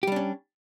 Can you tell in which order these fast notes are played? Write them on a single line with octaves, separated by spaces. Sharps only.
G4 G3 D4 C#4